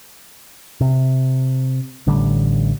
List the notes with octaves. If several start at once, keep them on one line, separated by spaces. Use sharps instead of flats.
C3
A1 A2 D3 G3